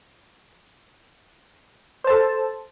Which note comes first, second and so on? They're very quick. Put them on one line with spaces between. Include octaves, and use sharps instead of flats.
C5 A5 A4